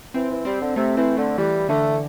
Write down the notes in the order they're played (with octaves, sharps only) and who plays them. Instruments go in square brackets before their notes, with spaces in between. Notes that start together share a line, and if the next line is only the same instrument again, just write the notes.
[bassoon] E3 [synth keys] C4
[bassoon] E3
[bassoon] G3 [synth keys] C4
[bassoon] D3
[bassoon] C3 [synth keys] A3
[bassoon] E3 [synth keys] C4
[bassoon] D3 [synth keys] A3
[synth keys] E3 [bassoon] G3
[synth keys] D3 [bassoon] A3